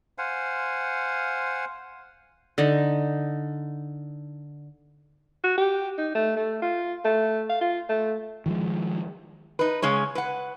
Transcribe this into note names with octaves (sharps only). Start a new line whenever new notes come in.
C5 F5 F#5 G#5
D3 D#4
F#4
G4
D#4
A3
A3
F4
A3
F5
F4
A3
D#3 F3 G#3
D#4 B4
C#3 G#3 C#4 C#5
B4 F#5